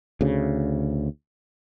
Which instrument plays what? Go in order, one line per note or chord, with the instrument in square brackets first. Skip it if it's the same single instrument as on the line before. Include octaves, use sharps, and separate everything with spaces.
[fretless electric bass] D2 C#3